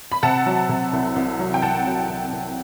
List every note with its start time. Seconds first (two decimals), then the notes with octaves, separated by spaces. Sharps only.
0.12 B5
0.23 C3 F#5 A5
0.46 F#3
0.69 C3
0.93 C2
1.16 C2
1.39 F#3
1.54 G5
1.62 C2 F#5 A5
1.86 F#3
2.09 C2
2.33 C2